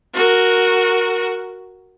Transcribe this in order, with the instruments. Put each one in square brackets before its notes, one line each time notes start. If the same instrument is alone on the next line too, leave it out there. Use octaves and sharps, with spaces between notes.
[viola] F#4 A#4